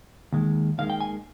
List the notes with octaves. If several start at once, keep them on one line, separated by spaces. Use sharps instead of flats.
D#2 D#3 G#3
D#2 D#3 G#3 F5
G5
G#5